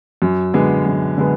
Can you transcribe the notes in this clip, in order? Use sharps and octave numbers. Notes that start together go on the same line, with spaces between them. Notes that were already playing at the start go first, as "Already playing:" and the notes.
F#2
D3 G#3 B3
F#2
D3 G#3 B3